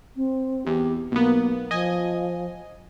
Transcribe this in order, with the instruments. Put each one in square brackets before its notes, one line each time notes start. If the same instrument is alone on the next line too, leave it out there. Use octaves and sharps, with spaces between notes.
[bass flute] C4
[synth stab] E2 [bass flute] G4
[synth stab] B1 B3 [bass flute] A#3
[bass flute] F3 [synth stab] D#5 G#5